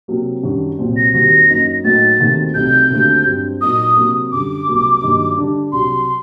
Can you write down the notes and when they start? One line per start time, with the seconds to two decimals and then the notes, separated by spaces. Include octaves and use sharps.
0.08 C3 F#3 A#3
0.43 F#2 D#3 G3 D4 F#4
0.78 C2 A#2 F#3 C4
0.97 A#6
1.14 D#2 D#3 G3 C4 F#4 A#6
1.49 F#2 F#3 A#3 D#4
1.84 A2 F#3 A#3 D#4 F#4 A6
2.19 D#2 D#3 A3 C4 F#4
2.54 C2 C3 F#3 A3 D#4 G6
2.90 D#2 D3 A3 C4 F#4
3.26 G2 F#3 C4
3.61 A#2 F#3 A#3 D#4 F#4 D#6
3.96 C3 F#3 A#3
4.32 F#2 D3 G3 D6
4.67 C2 C3 F#3 A#3
5.02 G2 D#3 F#3 A#3 D#4
5.37 D3 G3 D4
5.72 C2 C3 F#3 C6